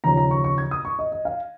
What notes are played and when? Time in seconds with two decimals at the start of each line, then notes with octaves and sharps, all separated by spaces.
0.04 D#2 C#3 F3 C#4 A#5
0.17 A#5
0.31 C#6
0.44 C#6
0.58 G#6
0.71 D#6
0.85 C#6
0.99 D#5
1.12 D#5
1.25 F5